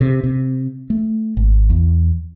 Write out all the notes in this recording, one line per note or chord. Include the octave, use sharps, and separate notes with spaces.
C3
C3
A3
G#1
E2